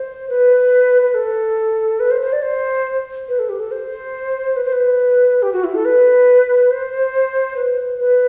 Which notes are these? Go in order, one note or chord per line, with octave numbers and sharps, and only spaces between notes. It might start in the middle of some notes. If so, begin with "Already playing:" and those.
Already playing: C5
B4
B4
A4
B4
C5
C5
D5
C5
B4
A4
G4
A4
C5
B4
C5
B4
G4
F#4
E4
A4
B4
C5
B4
B4